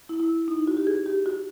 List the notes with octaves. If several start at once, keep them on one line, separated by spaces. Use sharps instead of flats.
E4
E4
D#4
E4
F#4
G4
G#4
G4
F#4